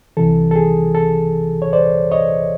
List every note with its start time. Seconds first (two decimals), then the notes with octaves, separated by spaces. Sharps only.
0.17 C2 C3 E3 A4
0.51 A4
0.56 G#4
0.95 A4
1.62 C#5
1.73 C5 D5
2.11 C#5 D#5